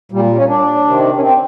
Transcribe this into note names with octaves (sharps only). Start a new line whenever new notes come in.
A#2 G3
C#4
D4
C3 D#3
C#4
C4